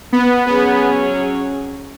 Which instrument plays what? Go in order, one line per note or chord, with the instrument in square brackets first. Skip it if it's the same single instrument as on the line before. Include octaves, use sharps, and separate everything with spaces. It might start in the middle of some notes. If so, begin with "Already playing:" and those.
[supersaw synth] B3
[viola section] F#3 C#4 G#4 [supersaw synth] B3